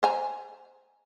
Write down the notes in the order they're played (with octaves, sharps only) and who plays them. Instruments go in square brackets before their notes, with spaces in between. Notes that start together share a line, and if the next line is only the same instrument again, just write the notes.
[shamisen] C5 G#5 A#5